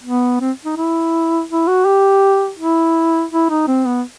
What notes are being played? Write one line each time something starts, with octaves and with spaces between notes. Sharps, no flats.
B3
C4
D#4
E4
E4
F#4
G4
E4
E4
D#4
C4
B3